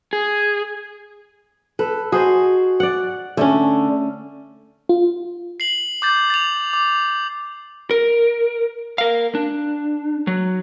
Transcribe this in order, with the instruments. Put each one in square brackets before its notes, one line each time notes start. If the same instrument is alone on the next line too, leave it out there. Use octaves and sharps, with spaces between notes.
[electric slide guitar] G#4
[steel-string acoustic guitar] A4 [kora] B4
[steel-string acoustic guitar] F#4 [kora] G#4 C5 D#5
[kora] D5 F#5
[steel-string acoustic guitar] D3 [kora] A3 C#4
[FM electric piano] F4
[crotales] C7 F#7
D6 G6 A6
A6 F7
D6
[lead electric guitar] A#4
A#4 F5
D4
F#3